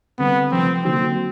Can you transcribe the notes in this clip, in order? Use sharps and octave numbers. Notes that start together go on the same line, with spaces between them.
D3 G3 B3 C4
C3 F3 A3 C4
D3 F#3 A#3 C4 D#4 F#4